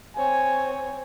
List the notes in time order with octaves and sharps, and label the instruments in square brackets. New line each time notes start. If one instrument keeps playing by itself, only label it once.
[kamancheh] C4 C#5 [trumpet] G#5